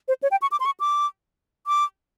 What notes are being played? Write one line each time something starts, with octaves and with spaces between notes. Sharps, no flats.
C5
C#5
G5
C#6
D6
C6
C#6
D6
D6